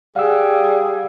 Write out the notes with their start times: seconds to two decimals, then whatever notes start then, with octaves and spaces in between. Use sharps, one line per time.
0.16 G3 G#4 F5 F#5 E6